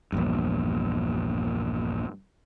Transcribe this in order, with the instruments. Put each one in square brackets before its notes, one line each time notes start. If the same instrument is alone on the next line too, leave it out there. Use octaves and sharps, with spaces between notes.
[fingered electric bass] A#1 E2 G2